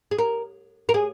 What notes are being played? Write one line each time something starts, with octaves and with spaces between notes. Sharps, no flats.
G#4
A#4
A#4
G#4